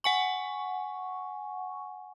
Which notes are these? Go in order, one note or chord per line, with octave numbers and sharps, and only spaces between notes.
F#5 G#5 C#6